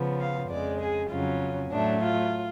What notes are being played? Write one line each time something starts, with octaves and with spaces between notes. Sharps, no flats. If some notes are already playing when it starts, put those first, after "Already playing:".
Already playing: C#3 F3 B3
F5
F2 C#3 G#3 D5
G#4
F2 C#3 F#3 C#4 F4
A2 F#3 A3 D4
F4